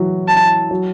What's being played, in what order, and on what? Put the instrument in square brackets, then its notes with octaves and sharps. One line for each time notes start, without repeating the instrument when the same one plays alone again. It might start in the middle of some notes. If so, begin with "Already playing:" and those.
Already playing: [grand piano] E3 F#3
[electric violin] A5
[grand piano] F#3